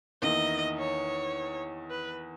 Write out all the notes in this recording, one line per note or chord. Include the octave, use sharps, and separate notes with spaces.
E2 D#3 A#3 E4 D#5
C#5
B4